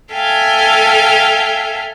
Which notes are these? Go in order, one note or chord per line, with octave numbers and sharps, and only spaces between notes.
A4 E5 F5 G5 G#5